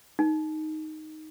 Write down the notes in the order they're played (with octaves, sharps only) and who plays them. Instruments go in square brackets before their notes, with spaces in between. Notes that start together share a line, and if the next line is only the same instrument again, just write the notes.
[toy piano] D#4